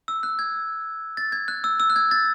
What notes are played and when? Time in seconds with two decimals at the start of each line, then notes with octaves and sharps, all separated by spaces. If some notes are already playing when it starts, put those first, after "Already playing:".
0.08 E6
0.23 F#6
0.39 G#6
1.17 A6
1.32 G#6
1.48 F#6
1.64 E6
1.80 E6
1.90 F#6
1.96 G#6
2.11 A6